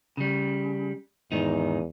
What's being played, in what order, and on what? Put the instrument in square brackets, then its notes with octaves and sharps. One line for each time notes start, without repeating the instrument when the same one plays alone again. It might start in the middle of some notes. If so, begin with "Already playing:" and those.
[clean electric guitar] C#3 G3
[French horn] E2 [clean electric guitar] G#2 D#3 D#4